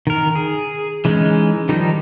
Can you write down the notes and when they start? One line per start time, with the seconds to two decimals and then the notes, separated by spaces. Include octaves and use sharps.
0.07 D#3 A#4
0.35 G#4
1.05 E3 G#3 C#4 D#4
1.69 D#3 F3 G3 D#4